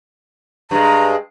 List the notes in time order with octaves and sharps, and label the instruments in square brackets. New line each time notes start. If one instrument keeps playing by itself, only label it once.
[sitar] G2 G#3 [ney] A#5